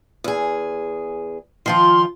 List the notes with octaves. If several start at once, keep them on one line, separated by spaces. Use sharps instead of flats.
E2 G#4
D#3 F3 F4 C6